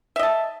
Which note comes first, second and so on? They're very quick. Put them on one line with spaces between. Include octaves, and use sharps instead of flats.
E5 D#5 A5